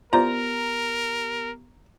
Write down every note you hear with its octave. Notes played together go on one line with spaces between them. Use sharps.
B3 F4 G4 A#4 C5 D5 A#5